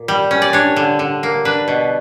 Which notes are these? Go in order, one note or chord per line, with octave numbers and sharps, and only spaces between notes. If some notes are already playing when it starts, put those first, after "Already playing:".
Already playing: A#2
G3
C#4
D5
D4 C#5
D3
D3
A#3
D4 B4
B2